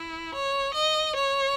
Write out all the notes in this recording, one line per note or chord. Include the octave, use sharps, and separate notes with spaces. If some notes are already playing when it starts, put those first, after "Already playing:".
Already playing: E4
C#5
D#5
C#5